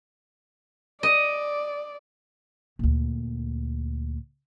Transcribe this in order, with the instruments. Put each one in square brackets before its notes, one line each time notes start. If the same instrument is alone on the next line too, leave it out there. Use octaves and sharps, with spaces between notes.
[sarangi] D5 [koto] D#5
[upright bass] D2 A#2